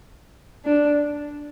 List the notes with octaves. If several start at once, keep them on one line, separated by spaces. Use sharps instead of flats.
D4